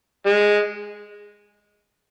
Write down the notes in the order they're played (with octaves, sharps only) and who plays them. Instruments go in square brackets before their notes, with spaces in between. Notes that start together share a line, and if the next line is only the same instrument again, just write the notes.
[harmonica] G#3